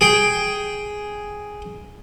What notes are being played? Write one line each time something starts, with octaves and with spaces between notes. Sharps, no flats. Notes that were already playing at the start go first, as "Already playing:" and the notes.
G#4 G5